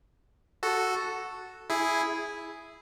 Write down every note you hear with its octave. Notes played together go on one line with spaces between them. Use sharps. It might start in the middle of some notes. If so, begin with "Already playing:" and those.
F#4 A4
E4 G#4